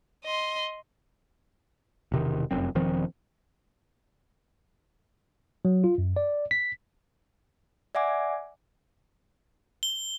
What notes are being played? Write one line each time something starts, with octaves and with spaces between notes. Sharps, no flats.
D#5 C6
E1 C3 D#3
F1 F#2 C4
E1 D#3 F3 C4
F#3
F4
F#2
D5
B6
D5 E5 F#5 G#5 D6
G7